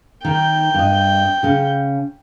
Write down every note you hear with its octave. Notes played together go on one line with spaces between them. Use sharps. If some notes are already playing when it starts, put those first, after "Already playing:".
D#3 D#4 G5
G2 D#5
C#3 C#4